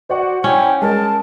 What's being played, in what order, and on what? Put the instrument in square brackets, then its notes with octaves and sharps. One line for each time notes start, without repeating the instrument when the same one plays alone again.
[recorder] F#4 [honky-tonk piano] C5 D5 F#5
[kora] C#4 [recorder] E4 [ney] G5
[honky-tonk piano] G#3 [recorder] A#4 [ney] A5